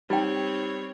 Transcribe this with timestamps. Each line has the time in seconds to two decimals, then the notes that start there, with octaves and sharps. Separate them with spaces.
0.10 G3 C4 D#4 C#5 G5